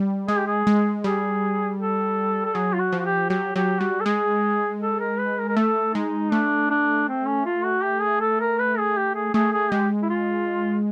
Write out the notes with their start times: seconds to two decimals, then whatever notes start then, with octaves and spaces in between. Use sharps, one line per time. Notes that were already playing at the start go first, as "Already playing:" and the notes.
Already playing: G3
0.28 G#3 G#4
0.38 G4
0.47 G#4
0.67 G#3
1.04 G3 G#4
1.80 A4
2.45 A4
2.55 F#3 G#4
2.74 F4
2.79 F#4
2.92 F3
2.99 F#4
3.06 G4
3.30 F#3 G4
3.56 F#3 G4
3.80 G3 F#4
4.01 A4
4.05 G#3 G#4
4.81 A4
5.00 A#4
5.18 B4
5.38 A#4
5.49 A#4
5.57 A3 A4
5.94 G#3 D#4
6.32 A3 D4
6.70 D4
7.08 C4
7.27 C#4
7.46 F4
7.64 F#4
7.83 G4
8.02 G#4
8.21 A4
8.40 A#4
8.59 B4
8.78 G#4
8.97 G4
9.15 G#4
9.34 A3 G#4
9.53 G#4
9.71 G#3 G4
10.02 E4
10.10 F4